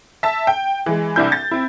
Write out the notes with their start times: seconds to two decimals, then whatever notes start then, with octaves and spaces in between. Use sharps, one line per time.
0.23 E5 A5
0.47 G5
0.86 E3 G#3
1.16 C2 D4 E4 G6
1.32 A6
1.51 C4 E4